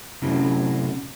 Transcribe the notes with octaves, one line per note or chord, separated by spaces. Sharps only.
A2 C3 F#3 C4 C#4 E4